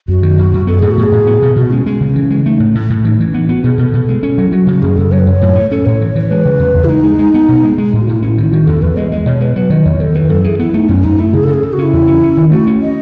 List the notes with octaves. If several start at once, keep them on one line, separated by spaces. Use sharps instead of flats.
F#2 F#4
D#3
F#2
F#2
B3 A4
A2 G#4
F#4
A2 G#4
A2
B3
B2
B2 F#4
G#3 C#4
G#3 C#4
C#3
C#4
E3
G#3
A3 D#4
A2
A2
A2
E3 D#4
E3 C#4
B3 D#4
B3 F#4
B2 G#4
B2 A4
B2
G#3
C#4
F#3
E4
F#3 F#4
C#3 F#4
F#2 G#4
F#2 A4
F#3 C#5
B4
F#2 C#5
A2
A3
C#4 A4
A2 C#5
E3
E3 C#5
G#3 B4
C#3
E2
E2
E4
G#3 D#4
G#3
G#3
B3
B2
G#3
G#3
A2
F#4
A2 E4
C#4 E4
D#3 E4
D#3 F#4
E2 A4
E2 B4
G#3 D#5
G#3 D#5
B2 C#5
G#3 B4
F#3 B4
D#3 D#5
E2 C#5
D#3 A4
E3 B4
F#2 A4
E3 G#4
B3 E4
A3 D#4
F#2 C#4
F#2 D#4
A3 E4
C#3 G#4
A4
C#3
G#4
C#3 A4
F#4
C#4 E4
E2
C#4
C#4
D#3
A3 F#4
C#4
D#5